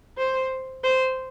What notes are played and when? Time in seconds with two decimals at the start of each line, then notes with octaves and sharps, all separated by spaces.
0.18 C5
0.84 C5